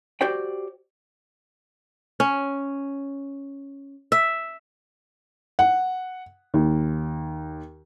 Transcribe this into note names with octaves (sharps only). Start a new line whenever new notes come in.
F#4 G4 C5 D5 G5
C#4
E5
F#5
D#2